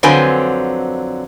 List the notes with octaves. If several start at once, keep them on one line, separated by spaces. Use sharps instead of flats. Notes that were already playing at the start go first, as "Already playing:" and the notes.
F2 D3 F#3 C4 B4 G#5